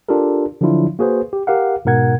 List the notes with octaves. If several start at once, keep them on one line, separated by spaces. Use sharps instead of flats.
D4 F4 G4 A4 A#4
D3 F3 F#3 D4 E4 F4
A#3 F#4 G#4 B4 C5
G4
G4 A#4 F5 F#5
G#2 B2 A#4 F#5 G#6